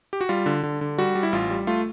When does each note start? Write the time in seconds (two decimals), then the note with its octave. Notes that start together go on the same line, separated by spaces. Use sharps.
0.13 G4
0.21 F#4
0.29 G3 F4
0.46 D3
0.63 D3
0.81 D3
0.98 G3 F#4
1.15 G3
1.23 E4
1.33 A1 F4
1.50 G3
1.67 A3 F4